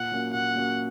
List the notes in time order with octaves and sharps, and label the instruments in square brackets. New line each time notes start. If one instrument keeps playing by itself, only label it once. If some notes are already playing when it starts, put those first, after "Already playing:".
Already playing: [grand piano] A#2 [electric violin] F#5
[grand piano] F#3 A#3 C#4
[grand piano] A#2 [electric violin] F#5
[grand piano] F#3 A#3 C#4